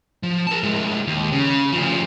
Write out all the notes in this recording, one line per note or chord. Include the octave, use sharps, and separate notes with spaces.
F3
A#4 A5
A2 G#3
D#2
C#3
D2 F3